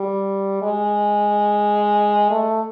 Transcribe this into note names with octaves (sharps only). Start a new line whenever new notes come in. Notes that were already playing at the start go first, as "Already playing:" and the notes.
Already playing: G3
G#3
A3